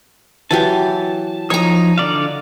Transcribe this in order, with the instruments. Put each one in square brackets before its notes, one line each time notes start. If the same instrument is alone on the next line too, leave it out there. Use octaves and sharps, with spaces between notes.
[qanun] E3 F#3 G4 [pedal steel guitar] A5
[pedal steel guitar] F3 D#4 D#6 [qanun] C#5 A#5
[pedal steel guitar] D3 D5 F5